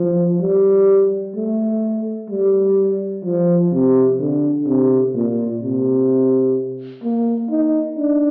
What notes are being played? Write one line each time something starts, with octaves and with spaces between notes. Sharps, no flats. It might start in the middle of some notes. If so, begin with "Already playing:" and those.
Already playing: F3
G3
A3
G3
F3
C3
D3
C3
A#2
C3
A#3
D#4
D4